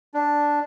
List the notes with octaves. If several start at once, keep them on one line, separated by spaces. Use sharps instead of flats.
D4